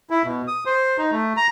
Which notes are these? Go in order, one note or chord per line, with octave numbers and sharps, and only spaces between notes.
E4
B2
D#6
C5
D#4
A3
A#5